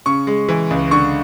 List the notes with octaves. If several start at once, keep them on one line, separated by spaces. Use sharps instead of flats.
C#3 C#6
G#3
E3
C#2
D3 C#6